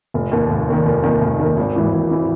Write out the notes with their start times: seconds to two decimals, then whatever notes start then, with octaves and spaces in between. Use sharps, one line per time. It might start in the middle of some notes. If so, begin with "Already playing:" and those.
0.14 F1
0.31 D#2 D#3
0.51 F1
0.69 D#2 D#3
0.85 F1
1.03 D#2 D#3
1.21 F1
1.40 D#2 D#3
1.57 G#1
1.76 G#2 E3
1.93 G#1
2.11 E3